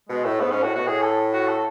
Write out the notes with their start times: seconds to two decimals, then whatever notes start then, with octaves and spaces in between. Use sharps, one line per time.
0.09 B2 G#3
0.25 A2 A3
0.40 G#2 B3
0.51 G#2 C#4
0.63 A2 F#4
0.75 B2 F#4
0.87 A2 G#4
1.02 A4
1.33 F#4
1.48 A4